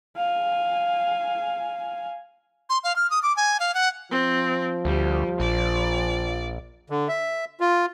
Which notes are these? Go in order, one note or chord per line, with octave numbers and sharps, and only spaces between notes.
F5 G#5
C6
F5
F6
D#6
D6
G#5
F5
F#5
F3 C4
D2 G3
A#1 D5
D3
E5
F4